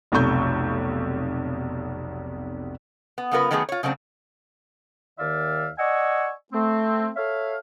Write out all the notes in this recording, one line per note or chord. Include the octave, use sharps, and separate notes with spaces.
F1 B1 C3 A4 C#6 G6
B3
C#3 F#3 B3 F4 A#4 B4
D#3 F#3 A3 B3 G4 G#4
F4 C#5
C#3 F#3 A3 C4 D4
D#2 D#3 D5 E5 F5
D5 D#5 F#5 G#5 C#6 E6
A3 C4
A4 C#5 E5 F5